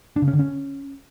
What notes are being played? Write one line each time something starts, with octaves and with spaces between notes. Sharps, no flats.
D4
C#3
C#4
D3
C#4